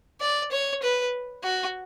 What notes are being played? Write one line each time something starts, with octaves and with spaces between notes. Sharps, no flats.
D5
C#5
B4
F#4